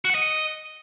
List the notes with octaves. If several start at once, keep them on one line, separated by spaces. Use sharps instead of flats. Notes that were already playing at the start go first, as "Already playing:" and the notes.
F#4
F#5
D#5